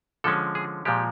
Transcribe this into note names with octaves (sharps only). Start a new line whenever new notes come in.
D3 F3 G#3 C#4 A4
G#4
A#2 F3 G#3 G4